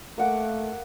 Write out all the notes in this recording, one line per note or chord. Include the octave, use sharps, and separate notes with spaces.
A3 A#3 F#5 D6